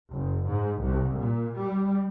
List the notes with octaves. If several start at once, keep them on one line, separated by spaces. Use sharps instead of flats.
F#1
G#2
C2
A#2
G3